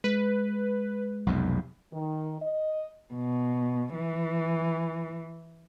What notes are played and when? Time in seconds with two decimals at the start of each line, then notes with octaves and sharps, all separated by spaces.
0.04 G#3 B4
1.27 B1 F2 C3
1.93 D#3
2.41 D#5
3.14 B2
3.95 E3